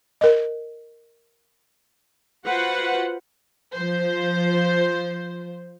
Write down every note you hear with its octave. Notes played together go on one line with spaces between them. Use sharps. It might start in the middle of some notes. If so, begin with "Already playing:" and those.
A#4 D#5
F4 F#4 B4 C5 F#5
F3 C5